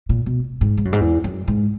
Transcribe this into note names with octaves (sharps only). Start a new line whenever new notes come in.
A#2
B2
G#2
G#2
F#2
G#2
E2
F#2
G#2